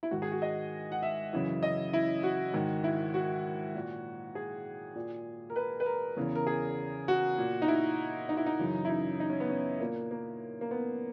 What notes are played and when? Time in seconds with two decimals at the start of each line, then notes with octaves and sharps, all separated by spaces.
0.03 E4
0.11 G#2 D#3 F#4
0.22 G#4
0.32 F#4
0.42 D#5
0.92 F#5
1.02 E5
1.33 F#2 C#3 E3
1.63 D#5
1.93 E4
2.23 F#4
2.54 G#2 D#3
2.84 E4
3.14 F#4
3.75 A#2
4.35 G#4
4.95 A#2
5.50 A#4
5.56 B4
5.80 B4
5.86 A#4
6.17 E2 C#3 E3
6.35 A#4
6.47 G#4
7.08 F#4
7.38 A#2
7.62 D#4
7.68 E4
8.29 D#4
8.37 E4
8.46 D#4
8.59 F#2 C#3 E3
8.85 E4
8.89 D#4
9.20 D#4
9.30 C#4
9.40 B3
9.50 C#4
9.80 A#2 A#3
10.11 A#3
10.61 A#3
10.71 B3